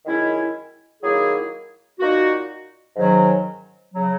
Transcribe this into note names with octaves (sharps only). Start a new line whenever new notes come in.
F#2 D#3 G#3 C#4 E4
D#3 F#3 A#3 E4 G#4
A#2 A#3 D#4 F#4
G#2 D#3 F#3 C#4
C#3 F#3